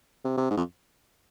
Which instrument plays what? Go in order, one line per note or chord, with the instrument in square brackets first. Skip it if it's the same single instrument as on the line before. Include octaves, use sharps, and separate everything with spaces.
[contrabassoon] C3
C3
G#2
F2